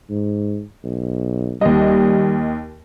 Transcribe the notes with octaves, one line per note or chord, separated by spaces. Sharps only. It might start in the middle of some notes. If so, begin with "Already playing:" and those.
G#2
B1
D#2 G3 D#5